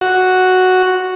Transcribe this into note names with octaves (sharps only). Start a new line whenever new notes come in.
F#4